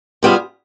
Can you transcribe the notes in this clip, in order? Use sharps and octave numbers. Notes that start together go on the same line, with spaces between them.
C3 G3 B3 F4 G#4